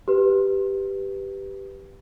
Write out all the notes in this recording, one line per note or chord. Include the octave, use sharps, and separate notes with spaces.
G4 B4